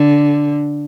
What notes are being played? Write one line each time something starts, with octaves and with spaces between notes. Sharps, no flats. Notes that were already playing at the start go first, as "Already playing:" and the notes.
Already playing: D3